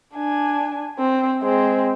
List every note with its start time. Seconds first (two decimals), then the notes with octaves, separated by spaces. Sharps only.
0.15 D4 G#5
0.99 C4
1.43 G#3 C4